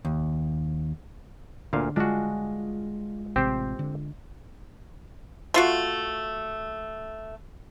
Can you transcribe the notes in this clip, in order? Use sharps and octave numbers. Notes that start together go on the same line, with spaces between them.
D#2
D2 A#2 D3 F5
G#3 D4 F4 F#4
A1 C3 C4 G4 C5
D3
A3 F4 F#4